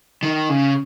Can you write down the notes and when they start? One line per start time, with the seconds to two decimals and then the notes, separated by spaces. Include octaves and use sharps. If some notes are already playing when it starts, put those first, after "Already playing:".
0.23 D#3
0.49 C#3